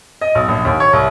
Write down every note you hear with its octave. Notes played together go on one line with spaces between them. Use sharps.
D#5
B1
A#1
D#2
C#5
C2